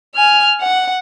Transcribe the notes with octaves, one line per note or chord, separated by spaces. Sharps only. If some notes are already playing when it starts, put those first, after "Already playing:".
G#5 F6
F#5